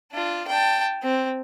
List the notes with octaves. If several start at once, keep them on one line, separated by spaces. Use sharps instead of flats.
D4 F4
G5 A5
C4